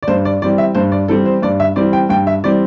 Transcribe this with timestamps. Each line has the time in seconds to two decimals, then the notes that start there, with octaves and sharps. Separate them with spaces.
0.03 D5
0.08 G2 C5
0.25 D5
0.42 E3 G3 C4 D5
0.58 E5
0.75 G2 C5
0.92 D5
1.08 E3 G3 C4 A4
1.26 C5
1.42 G2 D5
1.60 E5
1.76 E3 G3 C4 D5
1.93 G5
2.09 G2 G5
2.27 E5
2.44 E3 G3 C4 D5